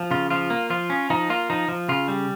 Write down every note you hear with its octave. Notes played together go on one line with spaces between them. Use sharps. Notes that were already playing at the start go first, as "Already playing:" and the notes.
Already playing: F3
C#3 F4
F3 F4
A#3
F3 F4
C#4
F3 D#4
A#3 F4
F3 D#4
F3
C#3 F4
G3